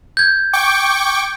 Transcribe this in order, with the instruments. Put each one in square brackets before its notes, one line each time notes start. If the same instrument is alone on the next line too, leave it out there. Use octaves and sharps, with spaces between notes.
[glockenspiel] G6 G#6
[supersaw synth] G5 C#6 D6